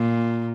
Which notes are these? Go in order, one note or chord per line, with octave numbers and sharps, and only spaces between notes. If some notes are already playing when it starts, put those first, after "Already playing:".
Already playing: A#2